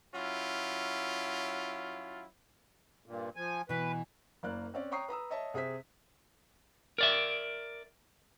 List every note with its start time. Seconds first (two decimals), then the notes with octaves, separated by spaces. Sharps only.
0.13 F#3 C#4 E4 F4
3.06 G2 A#2
3.36 F3 G#5
3.69 B2 E3 B4
4.43 F#1 A#3 D5 F#6
4.74 C4 C#4 D5
4.91 C#5 G5 A#5 C#6 D#6 C7
5.09 B4 A#5 D#6 E6
5.30 C#5 D#5 E5 A5
5.54 C3 G#4 C5 E5 B6
6.98 A#4 D5 E5